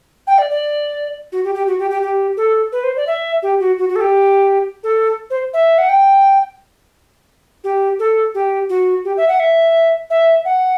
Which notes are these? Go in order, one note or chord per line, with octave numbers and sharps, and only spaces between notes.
G5
D5
D5
F#4
G4
G4
F#4
G4
G4
G4
A4
B4
C5
D5
E5
G4
F#4
F#4
F#4
A4
G4
A4
C5
E5
F#5
G5
G4
A4
G4
F#4
G4
E5
F#5
E5
E5
F#5